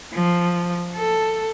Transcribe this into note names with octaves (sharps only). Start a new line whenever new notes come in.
F3
A4